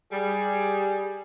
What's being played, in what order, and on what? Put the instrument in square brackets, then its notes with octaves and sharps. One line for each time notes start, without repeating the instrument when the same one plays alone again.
[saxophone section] G3 [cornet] G#4